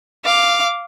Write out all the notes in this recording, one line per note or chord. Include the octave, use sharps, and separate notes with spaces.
F5 D6